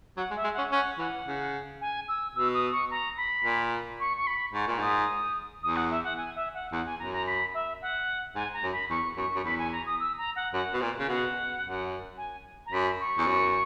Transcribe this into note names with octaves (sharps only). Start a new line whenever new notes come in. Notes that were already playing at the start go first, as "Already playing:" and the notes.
F#3 F#5
G#3
E5
G#3
C#4 F#5
C#4 F#5
E3 F#5
C#3
G#5
E6
B2 E6
D#6
C#6
A#5
B5
A#2
C#6
C#6
B5
G#2 C#6
A#2
G#2 D#6
E2 D#6
F#5
E5
F#5
G#5
E5
F#5
E2 F#5
G#5
F#2 A#5
A#5
B5
E5
F#5
G#2 G#5
A#5
F#2
B5
E2 C#6
F#2 C#6
F#2
E2 B5
G#5
A#5
D#6
E6
A#5
F#5
F#2 F#5
B2
A#2
C#3
B2 F#5
F#2
G#5
A#5
F#2 B5
C#6
E2
F#2